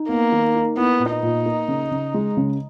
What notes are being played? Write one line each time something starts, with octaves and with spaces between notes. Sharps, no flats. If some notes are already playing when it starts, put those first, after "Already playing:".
Already playing: D#4
A#3 B3
D#3
D#4
B3 E4
A#2
D#4
A#2
A#3
C#3
C#3
G#3
C#3